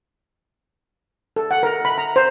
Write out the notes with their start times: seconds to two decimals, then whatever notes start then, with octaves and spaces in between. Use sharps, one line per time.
1.36 A4
1.51 F#5
1.63 A#4
1.85 B5
1.98 A#5
2.16 C5